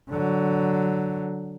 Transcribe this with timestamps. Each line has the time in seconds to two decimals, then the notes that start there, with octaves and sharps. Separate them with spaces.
0.10 D3 F#3